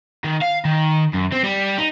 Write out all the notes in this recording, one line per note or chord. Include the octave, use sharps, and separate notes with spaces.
D#3
F5
D#3
F#2
C4
G3
D#4